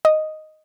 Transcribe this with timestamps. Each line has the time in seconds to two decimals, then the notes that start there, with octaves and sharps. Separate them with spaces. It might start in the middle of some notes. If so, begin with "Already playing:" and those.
0.05 D#5